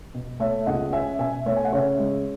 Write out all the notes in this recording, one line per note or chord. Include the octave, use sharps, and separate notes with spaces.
B2
A3 C#5 E5
C#2 D#5 F#5
C#4 E5 G#5
B2 E5 G#5
A3 C#5 E5
G#5
F#5
C#3 C#5 E5
G#3